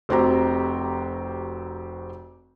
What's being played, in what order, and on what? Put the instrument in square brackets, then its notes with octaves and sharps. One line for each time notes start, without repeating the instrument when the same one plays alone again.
[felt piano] F1 C4 F#4 G4 A#5